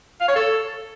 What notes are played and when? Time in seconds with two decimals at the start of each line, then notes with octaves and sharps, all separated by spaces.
0.21 F5
0.28 C#5
0.36 A4